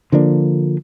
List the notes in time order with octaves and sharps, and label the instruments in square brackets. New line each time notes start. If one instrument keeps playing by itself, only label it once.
[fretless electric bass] D3 F3 A#3 D4